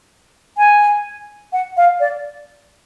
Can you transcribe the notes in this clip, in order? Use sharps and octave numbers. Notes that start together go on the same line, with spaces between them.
G#5
F#5
F5
D5